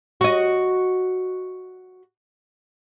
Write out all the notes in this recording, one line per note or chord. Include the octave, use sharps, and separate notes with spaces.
F#4 D#5